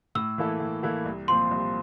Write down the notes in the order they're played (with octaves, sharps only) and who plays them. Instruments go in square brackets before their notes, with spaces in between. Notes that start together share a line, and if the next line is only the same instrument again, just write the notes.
[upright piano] A2 [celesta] E6
[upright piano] E3 A#3 E4 A4
A2
E3 A#3 E4 A4
C2
[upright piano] A#2 F3 C4 F4 [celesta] C6
[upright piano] C2